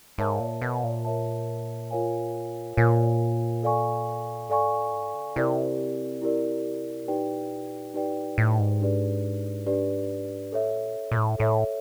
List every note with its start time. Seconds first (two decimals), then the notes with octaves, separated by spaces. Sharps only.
0.18 G#2 A#4 C#5 E5 A5
0.40 A#2
0.62 B2
0.84 A#2
1.05 A#4 C#5 E5 A5
1.91 F4 A#4 C#5 F5 G#5
2.77 A#2 F4 A#4 C#5 F5 G#5
3.63 A4 D5 F5 G#5 C#6
4.49 G#2 A4 D5 F5 G#5 C#6
4.70 A2
4.92 G#2
5.14 C#3
5.36 C3 E4 G4 A#4 D5
6.22 E4 G4 A#4 D5
7.04 B2
7.07 A#2 D#4 G4 B4 D5 G5
7.94 A2 D#4 G4 B4 D5 G5
8.15 A#2
8.38 A2
8.59 G#2
8.81 D4 G4 B4 D5
9.66 D4 G4 B4 D5
10.52 A2 A4 C#5 E5
10.74 A#2
11.12 A#2
11.17 A2
11.38 A2 A4 C#5 E5